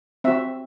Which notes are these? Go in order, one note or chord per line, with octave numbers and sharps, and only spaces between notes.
C4 F#4 E5